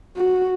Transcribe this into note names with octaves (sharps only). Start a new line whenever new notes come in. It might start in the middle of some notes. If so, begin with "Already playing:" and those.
F#4